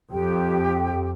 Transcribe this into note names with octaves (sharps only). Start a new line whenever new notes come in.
F2 G4 G5